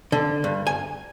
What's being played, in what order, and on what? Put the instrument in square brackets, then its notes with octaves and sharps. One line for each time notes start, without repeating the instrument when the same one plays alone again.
[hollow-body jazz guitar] D3
G2
G#5